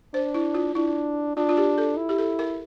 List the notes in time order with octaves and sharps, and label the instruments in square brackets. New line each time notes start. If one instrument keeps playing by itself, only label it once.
[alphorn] D4 [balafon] C5
[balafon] E4
F4
[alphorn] D4 [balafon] E4
[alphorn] D4 [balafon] F4
[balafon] F4
G4
A4
[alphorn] E4
[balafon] G4
A4
A#4